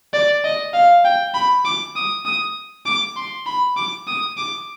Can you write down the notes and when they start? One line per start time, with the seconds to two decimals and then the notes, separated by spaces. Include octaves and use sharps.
0.14 D5
0.44 D#5
0.74 F5
1.05 G5
1.34 B5
1.65 D6
1.96 D#6
2.26 D#6
2.86 D6
3.16 C6
3.47 B5
3.77 D6
4.07 D#6
4.38 D6